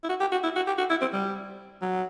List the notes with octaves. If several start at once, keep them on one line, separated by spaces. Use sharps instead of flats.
E4
F#4
G4
F#4
E4
F#4
G4
F#4
E4
C4
G3
F#3